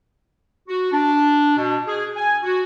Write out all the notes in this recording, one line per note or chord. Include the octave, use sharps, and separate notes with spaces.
F#4
D4
B2
G#4
G#5
F#4